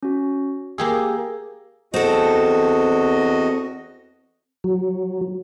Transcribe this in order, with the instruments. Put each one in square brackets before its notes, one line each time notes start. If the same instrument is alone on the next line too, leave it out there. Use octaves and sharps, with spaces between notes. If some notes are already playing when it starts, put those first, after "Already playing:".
[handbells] C#4 F#4
[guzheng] A#3 G4 G#4 [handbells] E6
[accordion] E2 F#4 D#5 [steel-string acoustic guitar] C4 A4
[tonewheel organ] F#3